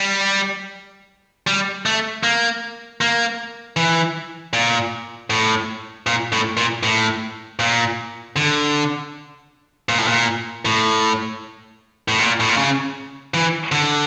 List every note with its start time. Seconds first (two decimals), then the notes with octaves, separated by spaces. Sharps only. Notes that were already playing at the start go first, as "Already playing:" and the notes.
Already playing: G3
1.47 G3
1.86 A3
2.23 A#3
3.01 A#3
3.77 E3
4.53 A#2
5.30 A2
6.07 A#2
6.32 A2
6.57 A#2
6.83 A2
7.59 A#2
8.36 D3
9.89 A#2
9.98 A2
10.08 A#2
10.65 A2
12.08 A2
12.19 A#2
12.40 A2
12.49 A#2
12.57 C#3
13.34 E3
13.72 D3